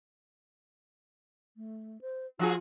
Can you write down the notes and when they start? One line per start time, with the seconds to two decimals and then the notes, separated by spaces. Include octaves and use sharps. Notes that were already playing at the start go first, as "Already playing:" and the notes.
1.57 A3
2.01 C5
2.39 F3 F4 F#4 G#4